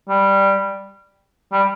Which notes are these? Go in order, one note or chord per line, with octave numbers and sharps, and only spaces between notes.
G3
G3